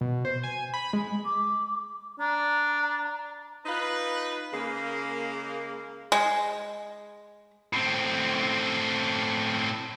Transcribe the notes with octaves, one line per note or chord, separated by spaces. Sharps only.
B2
C5
G#5
B5
G#3
D6
D4 A#5
D#4 F4 B4
C#3 G#3 A#3
G#3
A2 C4